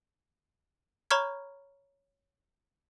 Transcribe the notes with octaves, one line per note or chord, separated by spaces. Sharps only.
C#5 A#5 B5 C#6 F6 G#6